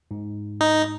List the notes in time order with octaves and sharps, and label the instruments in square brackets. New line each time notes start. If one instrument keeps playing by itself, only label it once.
[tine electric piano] G#2
[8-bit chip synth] D#4